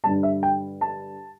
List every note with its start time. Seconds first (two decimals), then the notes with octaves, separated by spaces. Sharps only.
0.04 G2 D3 G3 A5
0.23 E5
0.43 G5
0.81 A5